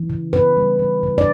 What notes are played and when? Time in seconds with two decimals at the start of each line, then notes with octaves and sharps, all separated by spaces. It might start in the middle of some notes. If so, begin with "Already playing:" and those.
Already playing: E3
0.10 C#3
0.33 C#3 B4
0.57 G3
0.79 E3
1.03 C#3
1.18 D5